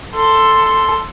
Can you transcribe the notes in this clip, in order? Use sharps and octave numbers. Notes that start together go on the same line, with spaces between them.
A4 C6